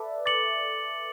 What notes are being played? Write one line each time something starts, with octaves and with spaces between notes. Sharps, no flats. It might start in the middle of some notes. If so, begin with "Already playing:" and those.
Already playing: A4 B4 D5 E5
D6 A6 C#7 F#7